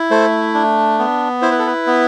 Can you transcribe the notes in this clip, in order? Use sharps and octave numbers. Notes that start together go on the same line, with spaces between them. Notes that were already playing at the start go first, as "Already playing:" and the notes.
Already playing: E4
A3 A4 C5
D4
B3
E4 C5
B4
A4
B4
B3